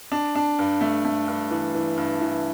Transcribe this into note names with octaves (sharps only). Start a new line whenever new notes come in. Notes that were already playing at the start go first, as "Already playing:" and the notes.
D4
D4
G2
A3
A3
G2
E3
E3
G2
E3